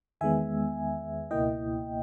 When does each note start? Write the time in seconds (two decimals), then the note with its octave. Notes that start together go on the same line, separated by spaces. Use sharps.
0.21 E2 D#3 G#3 B3 E5 G#5
1.31 C#2 B2 A#3 E4 D#5 G5